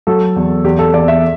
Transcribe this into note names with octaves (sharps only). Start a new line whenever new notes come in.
F#3 A4
E2
E2 G4
A4
E2 D5
E5